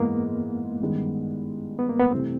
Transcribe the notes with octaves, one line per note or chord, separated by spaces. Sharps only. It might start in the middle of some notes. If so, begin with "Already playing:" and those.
Already playing: G#2 E3 G#3 A#3 B3
A1 G2 D#3 G#3 B3
B3
A#3
B3
C3 E3 A3 C4